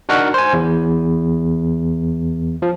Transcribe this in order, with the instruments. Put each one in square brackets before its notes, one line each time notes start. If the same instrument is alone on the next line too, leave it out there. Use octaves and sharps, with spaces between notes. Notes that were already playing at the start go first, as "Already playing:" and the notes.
[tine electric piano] D4 D#4 F#4 A#4 F#5
C5 G#5
E2
F3